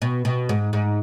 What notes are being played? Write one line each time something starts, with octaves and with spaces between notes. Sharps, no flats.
B2
B2
G#2
G#2